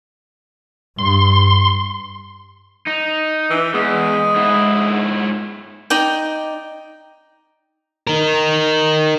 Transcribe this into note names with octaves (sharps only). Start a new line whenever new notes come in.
G2 C6
D#4
E3
E2 G#3
G#2 E4
D#4 D5 G5
D#4 A#4